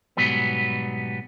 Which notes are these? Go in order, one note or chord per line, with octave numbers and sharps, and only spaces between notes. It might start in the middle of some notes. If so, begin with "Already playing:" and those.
G#2 B2 F#3 G3 B3